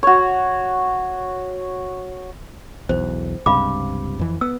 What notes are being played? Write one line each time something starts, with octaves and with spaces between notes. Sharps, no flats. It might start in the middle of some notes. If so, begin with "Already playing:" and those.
F#4 C#5
B1 E2 C5
C#2 G2 C3 F5 B5 D6
F2 E3
B3 E6